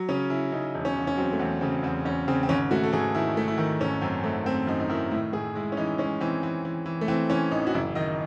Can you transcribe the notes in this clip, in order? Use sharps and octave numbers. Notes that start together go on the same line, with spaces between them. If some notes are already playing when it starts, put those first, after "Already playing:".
Already playing: F#3
C#3 C#4
C#3 E4
C#3 D#4
E1
C#4
E1
C#4
F#3 C4
A3
E2 C4
C#3 C4
E2 C4
E2 C#4
C#3 C4
C4
G#1 C#4
A3 F#4
A4
G#1 G#4
D#3 E4
A3
E4
D#3
G#1 C#4
F#2 C4
G#1 A3
A3 C4
F#2 D#4
D#4
D#3 E4
A2 E4
A2 G#4
G#3 E4
C#4
E3 D#4
G#3 C#4
E3 C4
E3
E3
E3
A3
E3 C4
E3 C#4
A1 D#4
F#4
F#1 E4
D#3 D#5